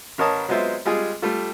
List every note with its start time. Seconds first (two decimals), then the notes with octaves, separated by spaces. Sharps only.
0.18 A1 A#4 C#5 D#5 A5 D#6
0.48 F#3 G#3 B3 F4 C5 E5
0.85 G3 G#3 F4 G#4
1.22 G3 A3 F4